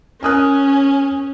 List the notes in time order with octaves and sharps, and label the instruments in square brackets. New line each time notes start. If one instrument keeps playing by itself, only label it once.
[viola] C#4 [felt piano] A#4 D#6 F#6 [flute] G#5